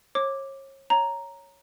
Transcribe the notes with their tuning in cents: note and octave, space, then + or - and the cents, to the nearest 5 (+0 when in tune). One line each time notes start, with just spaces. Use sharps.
C#5 -35 D6 +0
C#5 +0 A#5 +0